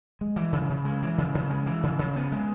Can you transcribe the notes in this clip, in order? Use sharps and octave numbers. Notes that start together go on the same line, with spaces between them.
G#3
E3
C#3
C#3
G#3
E3
C#3
C#3
G#3
E3
C#3
C#3
B3
G#3